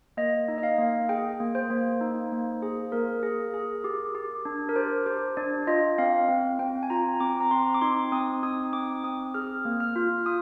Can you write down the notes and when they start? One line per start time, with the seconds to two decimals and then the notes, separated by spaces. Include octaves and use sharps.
0.17 A#3 D#5
0.48 D#4
0.58 D#5
0.63 F5
0.79 A#3
1.09 G#4 G5
1.40 A#3
1.55 C5
1.70 A#3
2.01 D#4
2.32 A#3
2.62 G#4
2.92 A#3 A#4
3.23 G#4
3.54 G#4
3.84 G4
4.15 G4
4.45 D4
4.69 A#4
4.76 G4 C5
5.06 G4 C5
5.37 D4 D5
5.67 F4 D#5
5.98 C4 F5
6.29 C4
6.59 C4 G5
6.83 G#5
6.90 F4 A#5
7.20 C4 D6
7.41 A#5
7.51 C4 C6
7.74 D6
7.81 D#4 C6
8.12 C4 D#6
8.43 D#4 D#6
8.73 C4 D6
9.04 C4 D#6
9.34 G#4 F6
9.65 A#3
9.80 F6
9.96 F4
10.26 F4 D#6